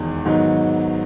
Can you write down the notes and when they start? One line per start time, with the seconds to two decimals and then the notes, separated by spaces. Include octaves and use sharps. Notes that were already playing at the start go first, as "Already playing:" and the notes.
Already playing: E1 E2 D#3 G#3
0.25 G#2 D#3 F#3 B3 D#4